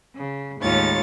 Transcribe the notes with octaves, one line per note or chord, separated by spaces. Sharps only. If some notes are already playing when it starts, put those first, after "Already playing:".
C#3
D#2 A2 G#3 F4 C#5 A6